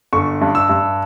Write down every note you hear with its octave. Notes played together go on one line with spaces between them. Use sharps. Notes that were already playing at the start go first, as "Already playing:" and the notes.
G1 C#6
G2
E6
G2